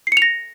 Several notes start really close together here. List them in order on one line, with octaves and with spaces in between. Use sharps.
C7 C#7 F7 A#6